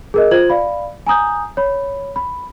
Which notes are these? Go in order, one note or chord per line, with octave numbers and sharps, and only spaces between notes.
G#4 A#4 D#5
F4 C5 G#6 F#7
D5 F5 B5
G#5 A#5 D#6 G6
C#5 B5
B5